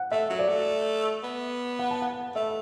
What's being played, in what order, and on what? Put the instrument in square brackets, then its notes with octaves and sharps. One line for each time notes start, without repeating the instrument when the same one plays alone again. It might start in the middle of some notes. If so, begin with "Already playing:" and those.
Already playing: [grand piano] F#5
[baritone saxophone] A3 [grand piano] E5
[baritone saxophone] F#3
[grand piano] D5
[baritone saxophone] A3
B3
[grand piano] F#5
A5
F#5
[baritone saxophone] A3 [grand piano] E5